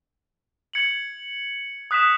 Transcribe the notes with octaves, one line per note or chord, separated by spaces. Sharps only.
G#6 C#7 F#7
D#6 F#6 B6 E7